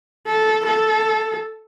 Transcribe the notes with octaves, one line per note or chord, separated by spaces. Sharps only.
A4
A4